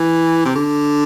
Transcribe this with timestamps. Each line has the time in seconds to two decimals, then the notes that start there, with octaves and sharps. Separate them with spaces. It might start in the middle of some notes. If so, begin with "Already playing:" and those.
Already playing: E3
0.45 C3
0.56 D3